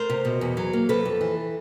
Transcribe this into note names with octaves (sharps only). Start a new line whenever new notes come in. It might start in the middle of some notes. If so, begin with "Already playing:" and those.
Already playing: A3 A#4 C5
C3
B2
E2
F#3
A#3
C3 A4 B4
F2
E3